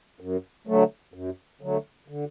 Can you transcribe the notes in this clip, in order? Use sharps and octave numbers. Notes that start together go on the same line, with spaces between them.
F#2
D3 F#3 A3
F#2
D3 F#3 A3
D3